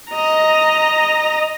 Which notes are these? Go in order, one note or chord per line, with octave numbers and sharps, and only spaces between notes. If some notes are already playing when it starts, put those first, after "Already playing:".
D#5 A#5